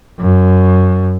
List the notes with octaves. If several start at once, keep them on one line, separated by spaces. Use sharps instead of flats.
F#2